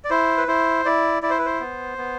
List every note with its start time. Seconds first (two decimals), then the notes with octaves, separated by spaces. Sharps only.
0.04 D5
0.10 E4 C5
0.38 B4
0.48 E4 C5
0.85 E4 D5
1.23 E4 D5
1.30 C5
1.38 B4
1.46 C5
1.60 B3
1.98 B3